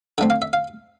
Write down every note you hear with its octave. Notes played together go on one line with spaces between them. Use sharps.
D3 A3 C4 G5
F5
E5
F5